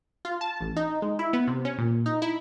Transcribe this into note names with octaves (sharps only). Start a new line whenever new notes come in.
F4
A5
A1
D#4
G#3
E4
B3
C3
C#4
A#2
D#4
E4